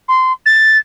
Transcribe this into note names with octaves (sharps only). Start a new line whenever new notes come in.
C6
A6